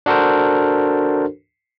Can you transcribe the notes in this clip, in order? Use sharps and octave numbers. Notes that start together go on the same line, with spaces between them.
D4 F#4 A4 A#4 C5